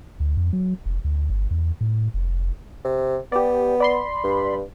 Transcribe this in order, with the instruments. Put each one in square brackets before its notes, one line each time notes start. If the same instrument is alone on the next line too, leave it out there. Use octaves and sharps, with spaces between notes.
[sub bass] D2
F2
F#3
F1
D2
G1
E2
A2
F1
[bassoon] C3
[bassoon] B3 [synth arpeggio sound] G4 D5
[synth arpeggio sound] D5 B5 C6
[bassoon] G2